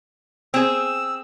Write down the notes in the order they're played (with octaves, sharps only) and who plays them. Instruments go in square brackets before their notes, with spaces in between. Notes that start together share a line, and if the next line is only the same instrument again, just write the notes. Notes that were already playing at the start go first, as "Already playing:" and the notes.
[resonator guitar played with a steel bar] C4 G#4 [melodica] E6